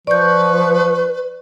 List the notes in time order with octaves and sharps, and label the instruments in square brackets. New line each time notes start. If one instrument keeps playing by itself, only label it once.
[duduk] F3 [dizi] B4 [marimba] D5 G6 [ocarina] C#6